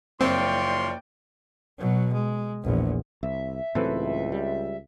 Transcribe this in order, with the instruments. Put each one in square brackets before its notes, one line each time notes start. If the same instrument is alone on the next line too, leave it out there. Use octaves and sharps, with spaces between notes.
[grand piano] F#1 [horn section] F3 C#5 C6 [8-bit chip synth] C4 [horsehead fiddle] D5 G5
[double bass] B2 F#3
G#3
A#1 E2
[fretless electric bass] C2 [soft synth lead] E5
[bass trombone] C#2 [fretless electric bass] A2 E3 F#3 [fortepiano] C4 A4 B4
[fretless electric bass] G3